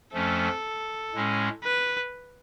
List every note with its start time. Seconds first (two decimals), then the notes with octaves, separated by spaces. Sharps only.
0.14 F2 F3 A3 C#4 A4
1.14 A2 G#3 C#4
1.63 B4